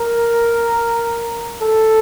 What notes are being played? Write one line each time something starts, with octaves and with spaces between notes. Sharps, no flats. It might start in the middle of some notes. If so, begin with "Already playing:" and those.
Already playing: A#4
A4